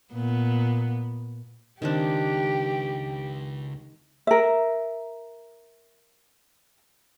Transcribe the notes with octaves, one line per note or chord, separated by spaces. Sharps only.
A#2 B3
C#2 D#3 C4 D4 G4
A#4 E5